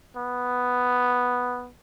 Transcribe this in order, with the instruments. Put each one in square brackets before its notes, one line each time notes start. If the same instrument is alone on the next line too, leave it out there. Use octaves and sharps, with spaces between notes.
[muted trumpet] B3